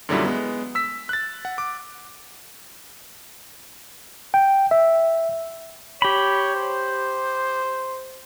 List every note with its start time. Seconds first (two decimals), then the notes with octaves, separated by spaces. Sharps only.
0.09 F#2 A#2 D3 F#3 G3 E4
0.25 G#3 B3
0.75 E6 B6
1.09 F#6 A6
1.45 F#5
1.58 D6
4.34 G5
4.71 E5
6.02 G4 C#5 B5
6.56 C5